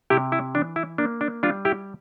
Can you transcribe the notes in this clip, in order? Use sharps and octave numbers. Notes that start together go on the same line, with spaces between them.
C3 E4 G4
E4
E3 D4
E4
A#3 D4
D4
G3 D4 F4
E4 G4